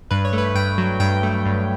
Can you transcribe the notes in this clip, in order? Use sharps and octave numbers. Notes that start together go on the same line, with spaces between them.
G2 B4
C#5
A3
B4
G2 G5
F#3
G2 G5
A3
G2